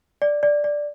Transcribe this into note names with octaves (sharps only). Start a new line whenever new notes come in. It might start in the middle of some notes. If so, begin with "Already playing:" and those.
D5
D5
D5